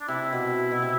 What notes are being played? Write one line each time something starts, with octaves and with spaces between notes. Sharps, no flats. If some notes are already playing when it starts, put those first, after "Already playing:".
D4
C3 E4
B2
B2
C3